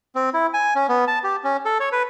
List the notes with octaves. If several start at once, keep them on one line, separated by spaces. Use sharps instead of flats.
C4
E4
G#5
C#4
B3
A5
G4
C#4
A4
C#5
B4